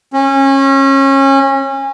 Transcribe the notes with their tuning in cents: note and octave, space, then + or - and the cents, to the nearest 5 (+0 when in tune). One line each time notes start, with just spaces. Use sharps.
C#4 -25